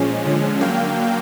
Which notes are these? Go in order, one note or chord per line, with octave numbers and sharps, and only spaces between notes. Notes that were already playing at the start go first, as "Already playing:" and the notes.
Already playing: A#2 F3 G#3 C#4
D3 F3 G#3 C#4
D3 F#3 A#3 F5 G5